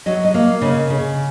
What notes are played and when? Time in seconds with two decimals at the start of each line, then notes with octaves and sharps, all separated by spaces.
0.06 F#3 D#5
0.25 D#5
0.34 A#3 F5
0.61 C#3 D#5
0.90 C#3